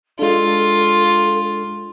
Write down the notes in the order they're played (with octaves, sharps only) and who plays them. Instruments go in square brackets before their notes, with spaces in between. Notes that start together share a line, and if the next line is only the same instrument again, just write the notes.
[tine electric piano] G#3 D4 [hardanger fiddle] F4 [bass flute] A4